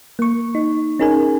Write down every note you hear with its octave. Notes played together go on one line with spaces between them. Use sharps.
A#3 C#6
D#4
C#4 D#4 G#4 A#4 G#5